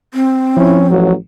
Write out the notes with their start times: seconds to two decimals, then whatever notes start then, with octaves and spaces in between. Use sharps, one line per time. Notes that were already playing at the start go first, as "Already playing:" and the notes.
0.14 C4
0.57 F3 C#4 E4
0.90 A1 F#3